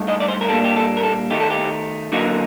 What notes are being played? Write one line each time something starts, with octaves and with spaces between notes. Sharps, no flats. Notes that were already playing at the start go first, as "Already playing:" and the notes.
Already playing: G2 A3 D#4
D#5
D5
C5
A#4
A#2 G3 A#3 D4 A4
G4
A4
A#4
A4
D#3 A3 D#4 G4
A4
G4
D3 F#3 A#3 D#4 F#4